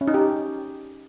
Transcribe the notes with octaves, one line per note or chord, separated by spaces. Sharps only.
C#4
D#4
G4